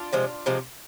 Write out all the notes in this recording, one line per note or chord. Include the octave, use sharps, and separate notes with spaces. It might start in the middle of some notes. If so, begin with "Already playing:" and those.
Already playing: D4 F4
C3 F3 G#3
C3 F3 G#3